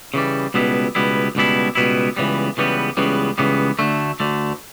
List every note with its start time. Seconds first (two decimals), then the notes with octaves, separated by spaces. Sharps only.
0.14 C#3 E3 G3
0.54 C#2 B2 G3 B3 E4
0.95 C#2 B2 G3 B3 E4
1.35 C#2 B2 G3 B3 E4
1.75 C#2 B2 G3 B3 E4
2.17 C#2 C#3 E3 G3 B3
2.57 C#2 C#3 E3 G3 B3
2.97 C#2 C#3 E3 G3 B3
3.38 C#2 C#3 E3 G3 B3
3.79 D2 D3 A3
4.20 D2 D3 A3